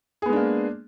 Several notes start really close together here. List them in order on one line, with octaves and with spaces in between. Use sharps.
G#4 B3 G#3 D4 A#3